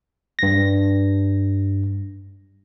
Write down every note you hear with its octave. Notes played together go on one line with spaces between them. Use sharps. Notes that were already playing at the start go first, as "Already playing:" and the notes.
G2 A#6